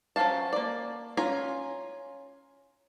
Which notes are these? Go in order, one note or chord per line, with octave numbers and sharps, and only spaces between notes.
F3 F#3 C#4 F5 A5
A#3 D5
C#4 F4 G#5 A#5